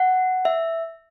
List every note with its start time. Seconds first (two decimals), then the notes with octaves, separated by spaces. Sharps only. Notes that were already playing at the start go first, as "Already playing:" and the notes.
Already playing: F#5
0.45 E5